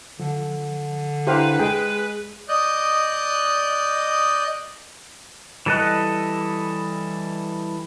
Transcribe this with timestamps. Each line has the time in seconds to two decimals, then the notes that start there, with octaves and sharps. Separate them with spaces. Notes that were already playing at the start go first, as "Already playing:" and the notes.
0.20 D3 F3
1.27 D4 E4 G4 B4 C5 F5 A#5
1.59 G#3 G#4 G5
2.49 D5 D#5 D#6 F#6 G6
5.66 E3 G3 A4 D#5 F#6